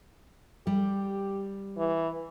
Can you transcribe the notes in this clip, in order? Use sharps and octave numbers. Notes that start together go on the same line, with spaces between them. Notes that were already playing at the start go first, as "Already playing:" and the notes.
G3 G4
E3